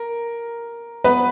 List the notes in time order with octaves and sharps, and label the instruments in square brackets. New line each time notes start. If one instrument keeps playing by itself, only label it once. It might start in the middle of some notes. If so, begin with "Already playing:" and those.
Already playing: [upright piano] A#4
B3 B4